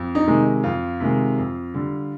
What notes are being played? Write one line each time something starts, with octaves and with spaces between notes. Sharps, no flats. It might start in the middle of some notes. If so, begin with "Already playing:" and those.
Already playing: F2
D#4
C3 D#3 G#3
F2 F4
C3 D#3 G#3
F2
D3 G3